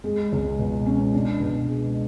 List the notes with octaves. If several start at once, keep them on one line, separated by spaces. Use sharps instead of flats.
G#3
C#2
B2
C#4
D4
B2
G#3